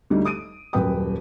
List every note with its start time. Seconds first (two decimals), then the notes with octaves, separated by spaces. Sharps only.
0.10 D2 G3 D#4
0.25 D#6 D7 D#7
0.73 D#1 F#2 B4 G5 D#6